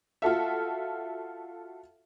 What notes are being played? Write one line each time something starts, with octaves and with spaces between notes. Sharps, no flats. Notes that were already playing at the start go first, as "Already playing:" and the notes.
F4 F#4 A4 E5